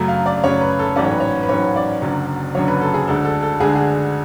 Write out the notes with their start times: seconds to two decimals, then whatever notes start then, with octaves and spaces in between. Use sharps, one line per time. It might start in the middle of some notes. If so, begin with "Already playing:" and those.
Already playing: F#2 C#3 F#3 A3
0.08 F5
0.26 D5
0.44 F#2 C#3 F#3 A3 C#5
0.61 B4
0.79 A4
0.96 A1 G#2 F#3 C#4 D5
1.04 C#5
1.12 B4
1.20 C#5
1.43 B4
1.49 A1 G#2 F#3 C#4 C#5
1.76 D5
2.02 F#1 F#2 D3 F#3
2.55 F#1 F#2 D3 F#3 C#5
2.68 B4
2.81 A4
2.94 G#4
3.07 D2 D3 G#3 D4 A4
3.25 A4
3.43 A4
3.60 D2 D3 G#3 D4 G#4
3.75 G#4